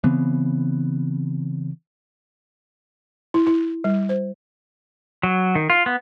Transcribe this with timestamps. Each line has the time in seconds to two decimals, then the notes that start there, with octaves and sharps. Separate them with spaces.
0.04 C#3 E3 B3 C4
3.34 E4
3.47 E4
3.84 G3
4.09 C5
5.23 F#3
5.55 D#3
5.70 F4
5.86 B3